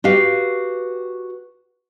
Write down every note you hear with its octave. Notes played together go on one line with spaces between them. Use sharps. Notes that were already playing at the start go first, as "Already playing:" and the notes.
F#4 G4 B4 F5